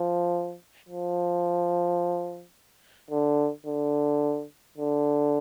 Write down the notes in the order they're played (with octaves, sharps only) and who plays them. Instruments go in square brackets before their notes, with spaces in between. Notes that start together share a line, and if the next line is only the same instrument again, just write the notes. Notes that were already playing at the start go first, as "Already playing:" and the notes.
Already playing: [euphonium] F3
F3
D3
D3
D3